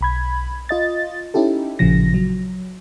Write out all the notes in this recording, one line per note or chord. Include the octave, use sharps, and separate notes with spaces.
B1 B5 G#6
F4 D#5 A6
C#4 D#4 E4 G4 A4
A1 A#2 C#3 F3 A#6
F#3